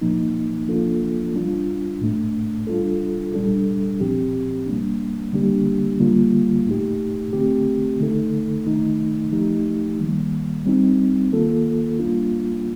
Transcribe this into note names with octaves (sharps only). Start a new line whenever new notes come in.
A#2 F3 A#3 D#4
F3 A#3 D4 F4 A4
G3 D4 F4
A2 A3 D4
G3 D4 F4 A4
A#2 G3 D4 A4
A#2 F3 C4 G4
G3 A#3 D4
D3 G3 A#3 D4 G4
D3 G3 A#3 F4
A2 A3 D#4 G4
D3 A3 C4 G4
D3 A3 D#4 A4
D#3 A3 D#4
F3 A3 D#4 G4
D#3 G3 A#3
G3 C4 D#4
D#3 A#3 F4 A4
G3 A#3 D4 F4